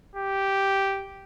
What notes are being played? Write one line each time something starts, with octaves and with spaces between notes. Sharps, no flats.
G4